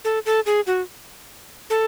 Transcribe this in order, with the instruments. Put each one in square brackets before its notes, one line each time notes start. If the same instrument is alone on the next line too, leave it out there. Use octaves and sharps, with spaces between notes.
[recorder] A4
A4
G#4
F#4
A4